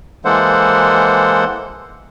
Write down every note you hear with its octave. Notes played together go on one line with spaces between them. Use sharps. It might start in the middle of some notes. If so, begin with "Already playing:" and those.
E3 G#3 A#3 A4 C5 F#5